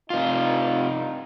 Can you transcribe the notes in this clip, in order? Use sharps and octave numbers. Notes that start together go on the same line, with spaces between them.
G2 C3 D#4 F4